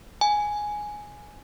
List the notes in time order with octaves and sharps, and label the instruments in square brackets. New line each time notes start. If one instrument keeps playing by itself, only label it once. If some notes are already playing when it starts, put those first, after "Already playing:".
[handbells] G#5